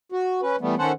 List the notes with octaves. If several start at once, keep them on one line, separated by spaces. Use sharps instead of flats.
F#4
C#4 B4
E3 G3 A3 B3
D#3 C#4 A4 C5 F#5